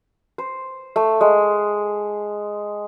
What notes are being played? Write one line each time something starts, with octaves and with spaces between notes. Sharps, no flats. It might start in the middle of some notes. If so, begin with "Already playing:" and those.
C5
A3
G#3